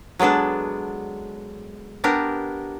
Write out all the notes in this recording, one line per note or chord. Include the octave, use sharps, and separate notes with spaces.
F#3 G#3 B3 D4 A4
B3 D4 G4 A#4